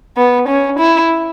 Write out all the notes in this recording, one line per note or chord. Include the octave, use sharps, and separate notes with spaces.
B3
C#4
E4